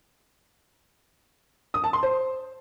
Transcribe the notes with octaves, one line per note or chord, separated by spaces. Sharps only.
D#6
A5
C6
C5